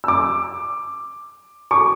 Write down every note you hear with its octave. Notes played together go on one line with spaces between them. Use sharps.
D6 E6
C#6 D6